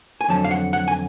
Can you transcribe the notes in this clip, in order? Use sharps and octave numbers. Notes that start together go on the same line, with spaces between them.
G#5
F2 D3 F#3 A5
F5
F#5
F#5
G#5